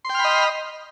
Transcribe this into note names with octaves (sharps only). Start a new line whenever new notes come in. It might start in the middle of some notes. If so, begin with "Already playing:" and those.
D#5 G5 B5 C6 F6